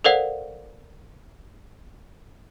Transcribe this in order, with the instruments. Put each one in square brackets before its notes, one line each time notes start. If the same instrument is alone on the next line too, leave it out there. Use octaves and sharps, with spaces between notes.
[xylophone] A4 A#4 C5 D5 F5 F#5